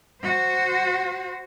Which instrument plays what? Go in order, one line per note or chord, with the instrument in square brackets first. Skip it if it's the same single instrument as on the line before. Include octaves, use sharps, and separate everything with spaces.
[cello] F#4 C5